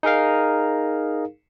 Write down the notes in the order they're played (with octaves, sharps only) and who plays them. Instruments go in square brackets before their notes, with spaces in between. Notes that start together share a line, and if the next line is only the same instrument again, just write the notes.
[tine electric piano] D#4 G#4 A#4 F5